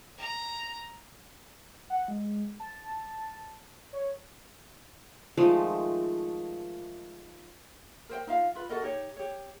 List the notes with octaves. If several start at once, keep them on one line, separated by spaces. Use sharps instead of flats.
A#5
F#5
G#3
A5
C#5
D#3 F3 G#3 A3
A#4 C5 G5
D#4 F4 F5
F4 B4
F#4 A4 A#4 D#5
D#4 G4 C#5
G4 C#5